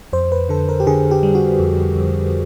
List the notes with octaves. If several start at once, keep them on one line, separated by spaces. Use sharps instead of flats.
F2 C5
B4
D3 A4
A#4
G4
D3 G#4
G4
G3
F#4
F2
F2